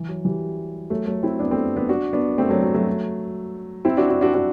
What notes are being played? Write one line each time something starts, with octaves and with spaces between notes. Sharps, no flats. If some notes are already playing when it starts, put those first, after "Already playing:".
Already playing: E3
F#3
E3 G3
F#3 A3
F#3 A3
C4 E4
B3 D4
A3 C4
B3 D4
D4 F#4
B3 D4
A3 C4
F#3 A3
F#3
F#3 A3
C4 E4
D4 F#4
D4 F#4
D4 F#4
D4 F#4